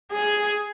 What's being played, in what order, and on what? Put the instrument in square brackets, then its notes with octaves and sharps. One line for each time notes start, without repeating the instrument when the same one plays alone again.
[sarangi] G#4